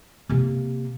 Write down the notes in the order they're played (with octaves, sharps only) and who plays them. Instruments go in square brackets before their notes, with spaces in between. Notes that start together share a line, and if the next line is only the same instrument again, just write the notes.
[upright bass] C3 A#3